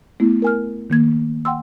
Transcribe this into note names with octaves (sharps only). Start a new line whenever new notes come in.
A3 B3 E4
A#4 G#5 F6
D#3 A#3 G#6
F#5 G5 C6 E6